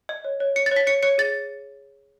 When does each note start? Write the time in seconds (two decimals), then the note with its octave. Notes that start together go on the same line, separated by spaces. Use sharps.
0.09 D#5
0.25 C#5
0.40 C#5
0.56 C#5 C#7
0.66 A6
0.71 C#5
0.76 B6
0.87 C#5 C#7
1.03 C#5 C#7
1.18 G#4 A6